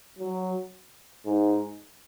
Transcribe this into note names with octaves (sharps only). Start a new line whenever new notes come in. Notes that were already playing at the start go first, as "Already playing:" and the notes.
F#3
G#2